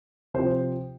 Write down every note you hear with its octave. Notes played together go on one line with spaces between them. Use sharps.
C3 F3 C5